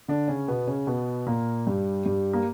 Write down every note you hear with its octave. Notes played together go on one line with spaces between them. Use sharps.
D3 D4
C#3 C#4
B2 B3
C#3 C#4
B2 B3
A#2 A#3
G2 G3
G2 G3
A#3